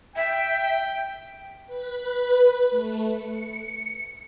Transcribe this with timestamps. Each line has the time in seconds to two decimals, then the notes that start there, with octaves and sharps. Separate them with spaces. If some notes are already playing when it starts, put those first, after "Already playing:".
0.16 E5 G5
1.67 B4
2.70 A3
3.10 C#7